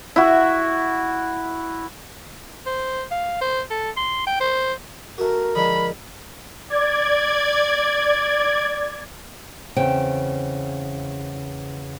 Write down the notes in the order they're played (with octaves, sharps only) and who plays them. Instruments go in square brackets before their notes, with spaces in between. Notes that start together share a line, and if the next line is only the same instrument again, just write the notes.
[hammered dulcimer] E4 F#4
[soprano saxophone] C5
F5
C5
A4
C6
G5
C5
[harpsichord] A3 F#4 [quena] A#4
[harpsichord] D3 F3 G#3 [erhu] B5
[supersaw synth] D5 G#6
[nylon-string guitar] E2 C#3 C4 G5